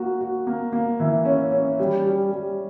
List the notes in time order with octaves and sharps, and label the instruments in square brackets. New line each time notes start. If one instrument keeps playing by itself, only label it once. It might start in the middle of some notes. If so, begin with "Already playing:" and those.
Already playing: [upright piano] A#3 F#4
F#4
A#3
A#3
E3
C#4
C#4
G3
G3
G3